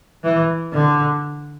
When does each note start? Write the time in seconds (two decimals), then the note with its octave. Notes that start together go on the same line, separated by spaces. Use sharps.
0.24 E3
0.72 D3